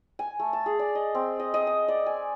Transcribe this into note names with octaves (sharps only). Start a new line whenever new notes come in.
G#5
A3
A5
G#4
D5
D#5
C4
D#5
D#5
D#6
D5
G#5